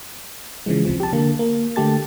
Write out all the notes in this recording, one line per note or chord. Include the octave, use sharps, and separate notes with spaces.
C#3 E3 F3 G#3
C#2 C3 F3
G4 A5
D3 A#3
A#3
D3 A3 G4 A5 A6